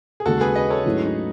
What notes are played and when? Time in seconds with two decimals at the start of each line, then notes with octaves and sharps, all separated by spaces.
0.20 G#4
0.25 D#2 C#3 G#3 F#4 A4
0.41 G#4 B4
0.55 B4 D#5
0.70 A4 C#5
0.86 G#2 F#3 A3 C#4 E4
1.05 D#4